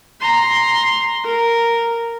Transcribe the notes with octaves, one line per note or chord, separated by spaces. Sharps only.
A#5 C6
A#4